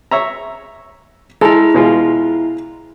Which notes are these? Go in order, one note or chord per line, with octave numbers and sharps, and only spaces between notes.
C#5 E5 A#5
G#3 E4 A4 A#5
B2 G#3 F4